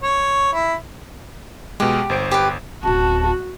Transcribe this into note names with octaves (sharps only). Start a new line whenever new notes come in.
C#5
E4
B2 G#3 G4
G1 C5 D7
G4 B4
D1 C#4 F#4 A5